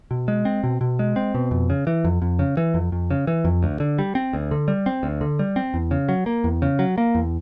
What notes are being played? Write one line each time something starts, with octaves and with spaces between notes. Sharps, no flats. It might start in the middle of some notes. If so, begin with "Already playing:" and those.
B2
G#3
C4
B2
B2
G#3
C4
B2
F2
C#3
E3
F2
F2
C#3
E3
F2
F2
C#3
E3
F2
D2
D3
G3
C4
D2
D3
G3
C4
D2
D3
G3
C4
E2
C#3
F#3
A#3
E2
C#3
F#3
A#3
E2